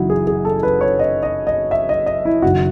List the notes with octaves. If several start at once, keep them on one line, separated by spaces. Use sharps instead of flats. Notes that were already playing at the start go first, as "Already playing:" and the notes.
Already playing: F#1 F#2 C#3 E3 D#4 E4 F#4
G#4
G#4
A4
B4
C#5
D#5
D#5
D#5
E5
D#5
D#5
E4
F#1 F#2 D#3 F#4